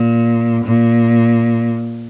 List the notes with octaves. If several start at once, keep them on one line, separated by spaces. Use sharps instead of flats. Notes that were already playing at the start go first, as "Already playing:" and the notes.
Already playing: A#2
A#2